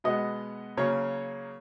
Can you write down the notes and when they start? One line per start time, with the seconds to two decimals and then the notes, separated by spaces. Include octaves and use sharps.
0.04 B2 G#3 B3 D#5
0.77 C#3 F#3 A#3 C#4 C#5